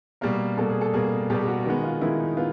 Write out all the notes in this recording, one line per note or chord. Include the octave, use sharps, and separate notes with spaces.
B2 G3 A#3 A#4
B2 G3 A#3 A4
G#4
A4
B2 G3 A#3 G#4
B2 G3 A#3 G4
G4
F#4
D#3 G#3 B3 F#4
F4
D#3 G#3 B3 E4
D#4
B3 F4